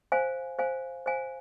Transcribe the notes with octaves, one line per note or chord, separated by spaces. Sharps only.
C5 F5 G#5
C5 F5 G#5
C5 F5 G#5